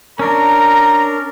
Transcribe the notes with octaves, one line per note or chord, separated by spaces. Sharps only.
C#4 D4 A#4 A#5